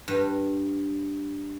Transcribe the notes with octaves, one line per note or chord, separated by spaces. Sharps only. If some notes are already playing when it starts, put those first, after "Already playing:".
G2